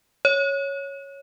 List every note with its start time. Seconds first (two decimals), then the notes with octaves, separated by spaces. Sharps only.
0.25 C#5